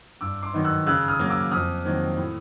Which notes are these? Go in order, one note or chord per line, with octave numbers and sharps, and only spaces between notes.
G2 D6 E6
C6 D6
D#3 F#3 B3 D#4
E6 F#6
C#3 E6 F#6
D#6 F6
F#3 A#3
D6 E6
F2 D#6 F6
C3 D#3 F#3 A#3
A2